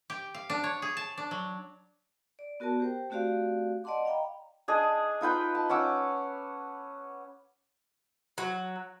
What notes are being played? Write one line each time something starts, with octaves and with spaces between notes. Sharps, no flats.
G4
F5
D4
C#5
G#4
A5
D4
F#3
D5
B3 F#4 A#4 D5 A5
G4 C5 G5
A3 C4 F#4 G4 D5 F5
D5 D#5 F#5 A5 C6 D6
D#5 F5 G5 A#5 B5
D4 G#4 D#5
D#4 F4 B4 G5
A5
C#4 F#5 D6 E6
F#3